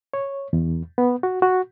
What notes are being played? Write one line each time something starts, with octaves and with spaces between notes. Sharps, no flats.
C#5
E2
B3
F#4
F#4